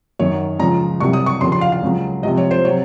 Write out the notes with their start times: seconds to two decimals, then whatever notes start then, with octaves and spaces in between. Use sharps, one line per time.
0.19 F#2 D#3 F#3 C#5
0.59 C#2 C#3 F3 A#5
1.00 C2 C3 F#3 C#6
1.13 D#6
1.26 C#6
1.41 D#2 C#3 F3 C6
1.52 C6
1.61 F5
1.72 F5
1.83 C#2 C#3 F#3
2.23 C#2 C3 F3 D#5
2.37 C#5
2.51 C5
2.65 C3 F#3 C#5